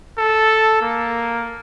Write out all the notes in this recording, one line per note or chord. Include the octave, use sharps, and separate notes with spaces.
A4
A#3